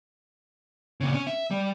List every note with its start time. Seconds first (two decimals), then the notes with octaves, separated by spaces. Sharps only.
1.01 A#2 C#3
1.14 C#4
1.27 E5
1.51 G3